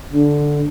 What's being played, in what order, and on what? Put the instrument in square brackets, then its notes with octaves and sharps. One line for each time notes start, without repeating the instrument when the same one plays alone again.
[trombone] D3 [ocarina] D4